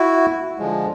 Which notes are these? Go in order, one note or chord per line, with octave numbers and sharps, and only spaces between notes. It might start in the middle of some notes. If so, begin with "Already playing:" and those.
Already playing: E4 F#4
D3 F3 G#3